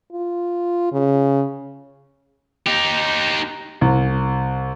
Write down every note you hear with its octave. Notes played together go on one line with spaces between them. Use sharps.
F4
C#3
D#4 G4
C2